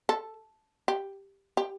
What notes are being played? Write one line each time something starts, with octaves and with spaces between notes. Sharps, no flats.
A4
G4
G4